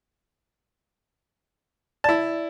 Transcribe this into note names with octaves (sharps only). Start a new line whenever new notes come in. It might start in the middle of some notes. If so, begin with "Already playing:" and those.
E4 D5 A5